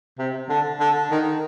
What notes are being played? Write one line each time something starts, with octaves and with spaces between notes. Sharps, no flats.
C3
D3
D3
D#3